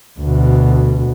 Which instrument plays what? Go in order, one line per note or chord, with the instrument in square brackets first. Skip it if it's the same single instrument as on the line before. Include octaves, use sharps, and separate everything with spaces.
[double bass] D2 B2